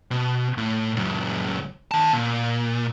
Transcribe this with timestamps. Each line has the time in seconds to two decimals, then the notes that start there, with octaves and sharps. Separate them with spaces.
0.11 B2
0.58 A2
0.96 C#2 F#2
1.91 D#3 A5
2.13 A#2